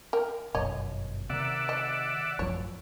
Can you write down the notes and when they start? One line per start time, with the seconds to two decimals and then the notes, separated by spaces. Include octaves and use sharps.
0.13 A#4 G5
0.55 G1 F#2 B2 C#5 D#5
1.30 C3 D#3 D5 E5 F#5
1.69 D#5
2.39 A1 F#2 F3 C#5